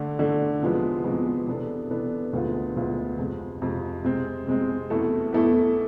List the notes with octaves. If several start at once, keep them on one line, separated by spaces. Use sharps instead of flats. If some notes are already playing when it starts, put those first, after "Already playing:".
Already playing: D3 A3 D4
D3 A3 D4
E2 C3 F3 G#3 B3
E2 C3 F3 G#3 B3
C3 E3 B3 D4 A4
C3 E3 B3 D4 A4
D2 D3 G#3 B3 F4
D2 D3 G#3 B3 F4
F2 C3 G#3
F2 C3 G#3
C3 G#3 C4
C3 G#3 C4
E2 B2 A3 E4 A4
E2 B2 A3 E4 A4